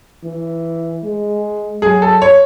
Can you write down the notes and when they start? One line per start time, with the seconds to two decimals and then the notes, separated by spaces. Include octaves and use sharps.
0.24 E3
1.04 G#3
1.82 F#3 G#4
2.02 A4
2.22 C#5